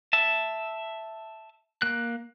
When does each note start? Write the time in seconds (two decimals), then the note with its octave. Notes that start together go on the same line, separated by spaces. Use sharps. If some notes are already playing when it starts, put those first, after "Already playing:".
0.13 E5 A5
1.82 A#3 F#6